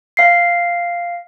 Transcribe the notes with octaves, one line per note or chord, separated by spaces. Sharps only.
F5 C7